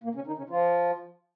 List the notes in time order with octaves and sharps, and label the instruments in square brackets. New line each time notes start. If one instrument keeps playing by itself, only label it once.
[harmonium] A#2 A#3
C#3 C#4
D#3 D#4
C#3 C#4
F3 F4